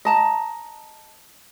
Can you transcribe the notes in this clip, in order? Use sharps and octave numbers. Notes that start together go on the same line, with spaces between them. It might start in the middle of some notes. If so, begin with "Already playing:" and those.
D#5 A5 A#5